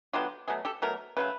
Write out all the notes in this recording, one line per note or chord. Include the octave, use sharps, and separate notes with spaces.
D3 F#3 B3 F4 G4
B2 F#3 A3 G#4
G4 A4
B2 F#3 A3 A#4
C#3 F#3 A3 B4